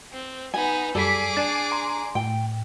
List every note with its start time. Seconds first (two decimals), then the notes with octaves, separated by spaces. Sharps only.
0.12 C4
0.54 B3 D#4 G#5
0.95 F#2 G3 G#4 A4 D5 D6 B6
1.37 D4 A6 C7
1.71 G#5 A#5 C6
2.15 A2 G5